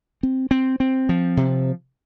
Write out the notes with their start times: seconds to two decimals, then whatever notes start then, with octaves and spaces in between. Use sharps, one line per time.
0.23 C4
0.51 C4
0.80 C4
1.09 F3
1.37 C3